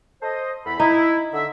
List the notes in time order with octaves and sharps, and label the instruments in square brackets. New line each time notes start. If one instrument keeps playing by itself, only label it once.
[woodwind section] A4 C5 D#5
E2 A4 B5
[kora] D#4 [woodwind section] E4
[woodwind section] D3 E5